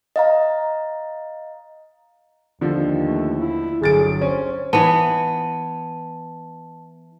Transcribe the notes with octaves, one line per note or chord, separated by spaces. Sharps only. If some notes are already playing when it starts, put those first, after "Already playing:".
D#5 F5 A#5
D#2 D3 F3
A3
E4
G1 F#3 G#4 A6 D7
C#4 C5
E3 B3 A5